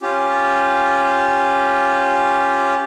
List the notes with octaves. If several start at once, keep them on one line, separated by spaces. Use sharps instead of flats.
C#4 F4 G4